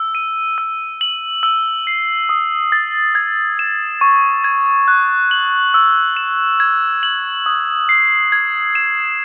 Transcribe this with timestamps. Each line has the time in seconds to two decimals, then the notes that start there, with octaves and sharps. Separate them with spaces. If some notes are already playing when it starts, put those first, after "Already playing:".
Already playing: E6
0.15 D#7
0.58 E6
1.01 F#7
1.43 E6
1.87 C7
2.29 D#6
2.72 A6
3.15 G#6
3.59 E7
4.01 C#6
4.44 G#6
4.88 F#6
5.31 F#7
5.74 E6
6.16 E7
6.60 G#6
7.03 F#7
7.46 D#6
7.89 C7
8.32 G#6
8.75 E7